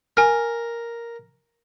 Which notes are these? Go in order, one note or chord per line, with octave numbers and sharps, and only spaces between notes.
A#4 G#5 F6